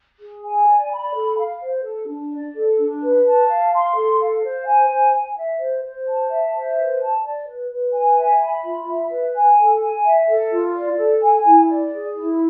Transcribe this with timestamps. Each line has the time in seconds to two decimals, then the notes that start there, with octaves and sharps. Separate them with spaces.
0.21 G#4
0.44 G#5
0.68 D5
0.91 B5
1.15 A4
1.37 F5
1.62 C5
1.84 A4
2.08 D4
2.31 D5
2.55 A4
2.78 D4
3.01 B4
3.25 A5
3.48 F5
3.73 C6
3.96 A4
4.20 F5
4.43 C5
4.66 G#5
4.89 C5
5.12 G#5
5.36 E5
5.59 C5
5.83 C5
6.07 A5
6.30 E5
6.54 C5
6.77 B4
7.00 A5
7.23 D5
7.47 B4
7.71 B4
7.94 G#5
8.16 E5
8.40 B5
8.64 F4
8.87 E5
9.11 B4
9.35 G#5
9.58 A4
9.80 G#5
10.05 E5
10.28 A4
10.52 F4
10.74 D5
10.98 A4
11.22 G#5
11.45 E4
11.68 D5
11.92 G#4
12.15 E4